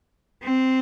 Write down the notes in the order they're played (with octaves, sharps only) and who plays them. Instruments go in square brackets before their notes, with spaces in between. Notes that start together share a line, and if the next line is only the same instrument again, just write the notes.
[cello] C4